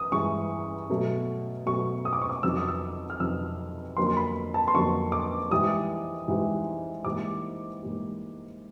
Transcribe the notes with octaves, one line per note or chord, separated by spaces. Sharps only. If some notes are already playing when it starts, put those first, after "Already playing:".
Already playing: E3 D#6
G2 E3 G#3 C#6
B2 F#3 A3
B2 F#3 A3 C#6
D#6
D6
C#6
D6
F2 C3 D#3 F#3 E6
D#6
E6
F6
F2 C3 D#3 F#3 E6
F2 D3 F#3 A#3 C6
C6
B5
A5
C6
F2 D3 F#3 A#3 C#6
D6
G#2 E3 G3 D#6
G#2 E3 G3
G#2 E3 G3 A#3 D6
G#2 E3 G3 A#3